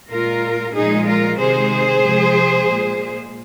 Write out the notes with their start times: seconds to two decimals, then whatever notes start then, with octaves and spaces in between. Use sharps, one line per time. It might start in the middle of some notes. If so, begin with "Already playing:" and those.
0.11 A#2 G#3 F4 A#4
0.75 A#2 F3 G#3 D#4 G#4
1.07 F4 A#4
1.40 C3 D#3 G#3 G#4 C5
2.04 C3 F3 G#3
2.69 A#2 G#3